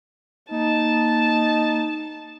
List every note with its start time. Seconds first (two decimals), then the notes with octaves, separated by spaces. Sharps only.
0.51 A#3 D#4 A5